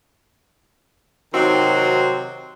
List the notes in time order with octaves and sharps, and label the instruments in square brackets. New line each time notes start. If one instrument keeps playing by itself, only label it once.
[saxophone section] C3 D#3 F#3 C4 D#4 F#4